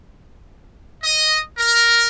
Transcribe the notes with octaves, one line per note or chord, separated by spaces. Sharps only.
D#5
A#4